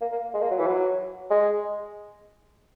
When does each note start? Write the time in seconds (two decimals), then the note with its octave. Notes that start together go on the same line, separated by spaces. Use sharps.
0.01 A#3
0.12 A#3
0.34 G#3
0.42 A#3
0.51 F#3
0.59 E3
0.67 F#3
1.30 G#3